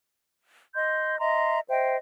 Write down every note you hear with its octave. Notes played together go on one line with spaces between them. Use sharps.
D#5 C6 G6
D#5 E5 A#5 C6
C5 D#5 E5 G5